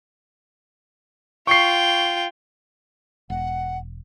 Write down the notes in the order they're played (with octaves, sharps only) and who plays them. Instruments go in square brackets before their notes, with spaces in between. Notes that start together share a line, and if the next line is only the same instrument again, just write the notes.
[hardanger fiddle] F4 G5 [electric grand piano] C#6 C7
[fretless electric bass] E1 [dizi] F#5